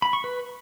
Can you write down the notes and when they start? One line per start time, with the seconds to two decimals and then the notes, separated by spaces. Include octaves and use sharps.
0.02 B5
0.13 C#6
0.24 B4